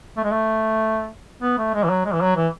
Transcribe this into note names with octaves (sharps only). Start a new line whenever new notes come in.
A3
G#3
A3
B3
A3
G#3
E3
F#3
G#3
E3
F#3
E3